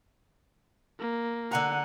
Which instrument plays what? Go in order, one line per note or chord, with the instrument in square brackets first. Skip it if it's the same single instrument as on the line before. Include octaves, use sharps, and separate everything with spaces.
[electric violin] A#3
[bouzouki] D3 G#5 A#5 [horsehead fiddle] F#5